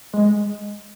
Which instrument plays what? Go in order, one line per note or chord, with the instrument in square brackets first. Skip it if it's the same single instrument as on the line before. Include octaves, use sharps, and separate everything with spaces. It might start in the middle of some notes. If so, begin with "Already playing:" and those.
[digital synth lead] G#3